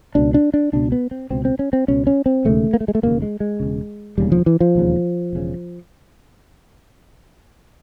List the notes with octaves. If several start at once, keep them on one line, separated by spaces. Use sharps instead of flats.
C#2 B2 D4
D4
D4
C#2 B2 D4
B3
C4
C#2 B2 C4
C4
C#4
C4
C#2 B2 C#4
C#4
C4
E1 D#2 C#3 A3
A#3
A3
G#3
A3
E1 D#2 C#3 A#3
G#3
G#3
E1 D#2 C#3
E1 D#2 C#3 G3
F3
E3
F3
E1 D#2 C#3
E1 C#3